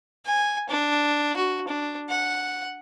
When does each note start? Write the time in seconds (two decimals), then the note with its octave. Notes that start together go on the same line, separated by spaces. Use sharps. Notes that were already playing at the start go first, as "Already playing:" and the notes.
0.26 G#5
0.70 D4
1.37 F#4
1.68 D4
2.09 F#5